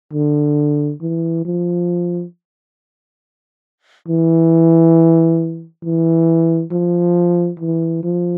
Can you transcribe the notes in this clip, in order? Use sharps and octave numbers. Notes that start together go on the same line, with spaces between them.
D3
E3
F3
E3
E3
F3
E3
F3